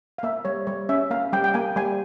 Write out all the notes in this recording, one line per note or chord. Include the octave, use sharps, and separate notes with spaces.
F5
A#3 E5
G3 C#5
G3 C#5
C#4 E5
A#3 F5
G3 G5
G5
A#3 G#5
G3 G#5